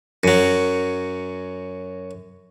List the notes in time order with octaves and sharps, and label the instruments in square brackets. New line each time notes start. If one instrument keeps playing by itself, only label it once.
[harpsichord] F#2 F#3